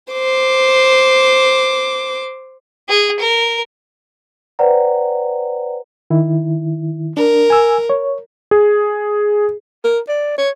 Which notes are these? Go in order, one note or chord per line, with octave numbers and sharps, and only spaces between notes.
C5 D6
G#4
A#4
B4 C5 D5 F#5 G5 A#5
D#3 E4
D4 A#4
G#5 E6
C#5
G#4
A#4
D5
C#5